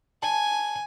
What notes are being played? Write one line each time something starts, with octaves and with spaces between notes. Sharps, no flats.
G#5 A5